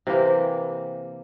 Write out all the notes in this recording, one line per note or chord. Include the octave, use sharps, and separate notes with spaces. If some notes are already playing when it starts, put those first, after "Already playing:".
C3 E3 A#3 G4